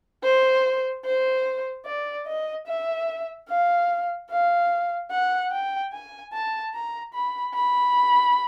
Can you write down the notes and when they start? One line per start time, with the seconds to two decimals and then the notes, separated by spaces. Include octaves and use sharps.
0.23 C5
1.04 C5
1.85 D5
2.27 D#5
2.67 E5
3.49 F5
4.30 F5
5.11 F#5
5.51 G5
5.92 G#5
6.33 A5
6.74 A#5
7.13 B5
7.54 B5